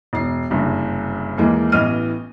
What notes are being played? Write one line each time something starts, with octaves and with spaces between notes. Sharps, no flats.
E1 C7
F#1 G2 C3
D#2 E3 G#3 A#3
A1 E3 B3 D#5 F6 D#7